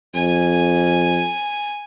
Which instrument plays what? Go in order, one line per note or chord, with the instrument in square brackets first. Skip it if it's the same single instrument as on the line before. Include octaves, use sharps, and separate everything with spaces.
[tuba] F2 [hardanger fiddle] G#5